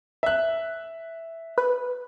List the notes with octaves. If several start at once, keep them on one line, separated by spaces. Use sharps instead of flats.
E5 F#6
B4